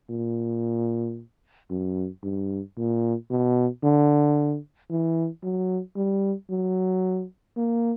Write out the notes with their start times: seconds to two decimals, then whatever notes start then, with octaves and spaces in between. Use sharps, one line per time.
0.10 A#2
1.70 F#2
2.23 G2
2.77 A#2
3.30 B2
3.83 D3
4.91 E3
5.43 F#3
5.96 G3
6.50 F#3
7.57 A#3